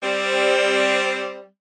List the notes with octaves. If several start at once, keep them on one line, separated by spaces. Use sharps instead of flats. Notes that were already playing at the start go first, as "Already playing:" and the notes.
G3 C4